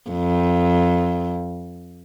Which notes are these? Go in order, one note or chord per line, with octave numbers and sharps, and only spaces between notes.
F2